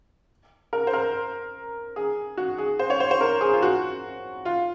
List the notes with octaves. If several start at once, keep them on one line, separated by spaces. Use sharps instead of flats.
A#4
C5
A#4
G#4
F#4
G#4
C5
C#5
C5
C5
A#4
G#4
F4
F#4
F4